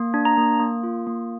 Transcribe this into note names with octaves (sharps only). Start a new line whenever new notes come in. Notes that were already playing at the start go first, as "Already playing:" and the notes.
Already playing: A#3
D4
A#5
A#3
A#3
F4
A#3